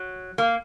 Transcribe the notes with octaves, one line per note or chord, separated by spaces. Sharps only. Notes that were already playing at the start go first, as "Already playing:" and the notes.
Already playing: F#3
A#3